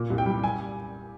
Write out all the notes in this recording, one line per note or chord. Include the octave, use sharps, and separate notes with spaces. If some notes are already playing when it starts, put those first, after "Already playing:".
Already playing: A#2
C2
G5
G3
G#5